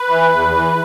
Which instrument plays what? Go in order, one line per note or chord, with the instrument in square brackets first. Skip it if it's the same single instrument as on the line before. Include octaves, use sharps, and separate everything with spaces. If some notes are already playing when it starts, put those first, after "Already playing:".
Already playing: [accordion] B4
E3
E2
E3